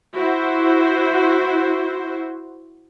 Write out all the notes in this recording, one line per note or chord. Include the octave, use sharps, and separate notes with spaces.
E4 F#4 C5